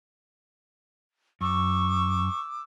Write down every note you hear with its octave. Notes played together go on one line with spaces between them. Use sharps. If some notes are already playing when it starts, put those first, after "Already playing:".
F#2 C#6 D6 E6